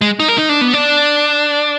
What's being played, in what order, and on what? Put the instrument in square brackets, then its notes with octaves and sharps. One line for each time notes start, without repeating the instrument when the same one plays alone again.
[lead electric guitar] G#3
D#4
A#4
D#4
D4
B3
D4